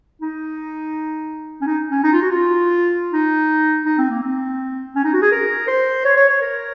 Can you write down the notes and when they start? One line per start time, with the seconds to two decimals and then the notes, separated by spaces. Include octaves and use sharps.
0.22 D#4
1.61 C#4
1.67 D#4
1.91 C#4
2.03 D#4
2.13 F4
2.22 F#4
2.31 F4
3.13 D#4
3.85 D#4
3.98 C4
4.10 A#3
4.23 C4
4.96 C#4
5.04 D#4
5.13 F#4
5.22 G#4
5.32 A#4
5.67 C5
6.05 C#5
6.17 C#5
6.29 C#5
6.41 A#4